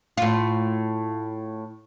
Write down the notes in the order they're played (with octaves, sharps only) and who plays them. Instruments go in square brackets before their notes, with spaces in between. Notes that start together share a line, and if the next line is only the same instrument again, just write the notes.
[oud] A2 F4